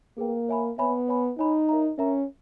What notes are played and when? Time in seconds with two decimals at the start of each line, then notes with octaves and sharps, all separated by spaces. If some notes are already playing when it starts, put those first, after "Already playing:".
0.18 A#3 G#4 B4 G5
0.48 C#5 E5 G#5 B5
0.78 B3 C#5 E5 G#5 B5
1.08 C#5 G#5 B5
1.38 D#4 C#5 G#5 B5
1.69 A#4 C#5 E5 A#5
1.98 C#4 A#4 C#5 E5 A#5